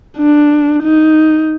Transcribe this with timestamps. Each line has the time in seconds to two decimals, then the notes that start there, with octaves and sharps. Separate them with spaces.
0.18 D4
0.83 D#4